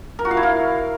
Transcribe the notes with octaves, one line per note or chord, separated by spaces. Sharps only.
A#4
F#4
F5
E4
F5